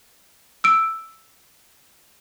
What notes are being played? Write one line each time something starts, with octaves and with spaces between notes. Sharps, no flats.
E6 D7